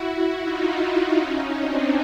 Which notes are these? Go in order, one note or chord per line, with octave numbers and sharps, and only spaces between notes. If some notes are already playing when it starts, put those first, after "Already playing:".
Already playing: E4 F#4
D#4 F4
C#4 D#4
C4 D4